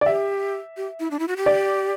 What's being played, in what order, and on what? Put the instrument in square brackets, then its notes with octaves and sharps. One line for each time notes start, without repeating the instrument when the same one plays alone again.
[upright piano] D5
[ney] G4 [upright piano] E5
[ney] G4
E4
D4
E4
F#4
G4
[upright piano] D5